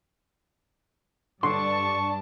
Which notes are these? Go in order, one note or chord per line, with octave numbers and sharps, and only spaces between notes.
G2 D3 D4 A5 C6 C#6